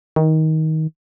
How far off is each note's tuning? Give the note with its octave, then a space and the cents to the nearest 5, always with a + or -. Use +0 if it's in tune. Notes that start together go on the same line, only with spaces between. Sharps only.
D#3 +20